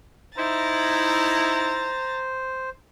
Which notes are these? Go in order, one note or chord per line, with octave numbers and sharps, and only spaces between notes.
D#4 E4 C5 A#5 A6